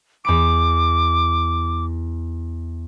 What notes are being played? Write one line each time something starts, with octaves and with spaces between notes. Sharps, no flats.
E2 B5 D6 D7